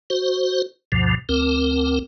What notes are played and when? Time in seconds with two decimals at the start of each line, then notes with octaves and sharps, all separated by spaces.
0.10 F#4 C5
0.92 D2 G2 B2 F3
1.29 D2 C4 A#4